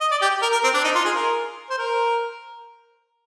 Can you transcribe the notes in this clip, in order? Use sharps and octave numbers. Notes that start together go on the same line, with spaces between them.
D#5
D5
G4
A#4
A#4
C4
D4
D#4
F4
G#4
A#4
C5
A#4